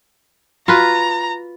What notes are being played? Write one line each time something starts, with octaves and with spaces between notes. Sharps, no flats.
F4 F#4 B4 A#5